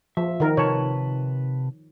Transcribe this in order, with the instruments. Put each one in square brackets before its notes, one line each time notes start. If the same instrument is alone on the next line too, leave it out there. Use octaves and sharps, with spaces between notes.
[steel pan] F3 [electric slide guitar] E5
[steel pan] D#3 A#4
[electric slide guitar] C3 B4 A5 [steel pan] C#5